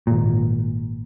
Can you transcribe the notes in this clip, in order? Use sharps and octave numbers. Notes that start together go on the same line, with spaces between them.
G#1 A#2